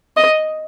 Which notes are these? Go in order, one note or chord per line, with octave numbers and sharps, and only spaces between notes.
D#5